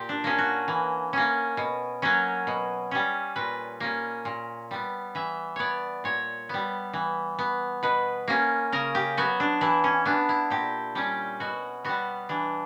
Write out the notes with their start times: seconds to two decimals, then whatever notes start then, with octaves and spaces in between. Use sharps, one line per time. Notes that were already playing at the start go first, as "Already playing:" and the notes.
Already playing: A#2 G4
0.09 D4
0.24 A#3 C#4
0.38 F#4
0.68 E3
1.13 A#3 C#4
1.57 B2
2.02 F#3 A#3 C#4
2.47 B2
2.91 G3 C#4
3.36 A#2 B4
3.80 A#3 C#4
4.25 A#2
4.71 G3 B3
5.15 E3 E5
5.56 B3 C#5 D5
6.04 A#2 C#5
6.49 G3 B3
6.93 E3
7.39 B3
7.83 B2 B4
8.28 A#3 C#4
8.72 C#3 A#4
8.95 G4
9.17 F#3 B3 F#4
9.40 D4
9.61 E3 E4
9.84 C#4
10.05 B3 D4
10.29 E4
10.50 A#2 G4
10.95 G3 C#4 G4
11.40 B2 F#4
11.85 G3 B3 F#4
12.29 E3 D4